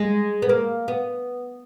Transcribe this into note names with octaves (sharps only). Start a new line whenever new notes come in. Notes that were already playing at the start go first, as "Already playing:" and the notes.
Already playing: G#3
B3
A#3
B3